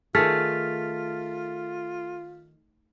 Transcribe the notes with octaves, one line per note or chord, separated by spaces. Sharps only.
D#3 A3 F4 G#4 F6 A6 B6